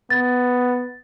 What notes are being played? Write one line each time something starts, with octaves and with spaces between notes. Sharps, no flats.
B3 A6